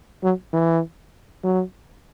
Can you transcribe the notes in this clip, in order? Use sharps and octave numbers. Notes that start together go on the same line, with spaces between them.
F#3
E3
F#3